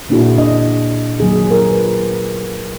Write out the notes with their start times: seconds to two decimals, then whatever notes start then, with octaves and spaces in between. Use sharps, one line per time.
0.09 A#2 A#3 D4 E4 F#4 G#4
0.38 D4 D#5
1.20 D#3 F#3 A#3 G#4
1.51 F4 A#4
1.71 B4